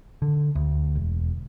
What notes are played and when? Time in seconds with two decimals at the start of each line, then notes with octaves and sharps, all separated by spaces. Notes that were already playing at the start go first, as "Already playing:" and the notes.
0.22 D3
0.55 D2
0.95 E1